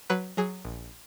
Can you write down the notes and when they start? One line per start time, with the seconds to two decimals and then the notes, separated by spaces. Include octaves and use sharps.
0.10 F#3 B4
0.37 F#3 G#4
0.65 A#1